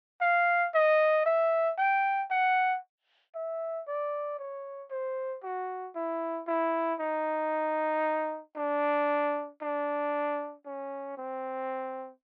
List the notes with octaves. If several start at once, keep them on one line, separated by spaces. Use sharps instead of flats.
F5
D#5
E5
G5
F#5
E5
D5
C#5
C5
F#4
E4
E4
D#4
D4
D4
C#4
C4